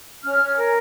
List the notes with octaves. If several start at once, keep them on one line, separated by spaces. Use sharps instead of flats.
C#4 F6
C#4
A#4